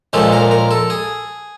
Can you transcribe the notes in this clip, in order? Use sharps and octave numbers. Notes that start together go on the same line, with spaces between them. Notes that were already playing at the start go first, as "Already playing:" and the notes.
A#2 F3 G#3 C#4 A4
A#4
A#4
A4
G#4